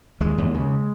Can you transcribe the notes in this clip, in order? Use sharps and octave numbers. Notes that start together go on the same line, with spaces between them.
D#2 G#3
D#2
C#3